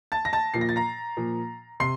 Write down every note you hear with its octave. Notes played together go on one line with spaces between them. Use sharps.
A5 A6
A#6
A5 A6
A#2 F3 C7
A#6
A6
A#5 A#6
A#2 F3
C3 C6 C7